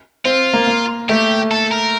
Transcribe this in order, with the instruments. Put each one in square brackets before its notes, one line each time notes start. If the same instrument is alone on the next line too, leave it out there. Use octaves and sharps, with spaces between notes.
[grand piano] C4 [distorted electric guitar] F4
[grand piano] A#3
A#3
[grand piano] A3 [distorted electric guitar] G4
[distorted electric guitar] A4
A#4